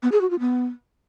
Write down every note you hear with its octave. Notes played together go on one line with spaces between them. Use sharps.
B3
G#4
F#4
F4
B3